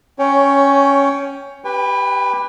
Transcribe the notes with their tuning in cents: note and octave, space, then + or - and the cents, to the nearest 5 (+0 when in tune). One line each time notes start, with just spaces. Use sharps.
C#4 +0 C#5 +15 G5 +0
G4 +0 B4 +0 G5 +45